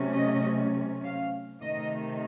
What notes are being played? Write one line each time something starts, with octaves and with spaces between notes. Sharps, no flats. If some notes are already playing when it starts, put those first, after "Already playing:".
Already playing: C3 F#3 A3 C#4
D#5
F5
C3 D#3 A3 D#4 D#5